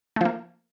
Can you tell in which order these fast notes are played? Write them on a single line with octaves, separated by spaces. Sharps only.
A3 F3 A#3